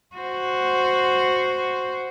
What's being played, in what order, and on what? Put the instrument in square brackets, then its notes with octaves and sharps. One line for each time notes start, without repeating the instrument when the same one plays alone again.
[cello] F#4 C5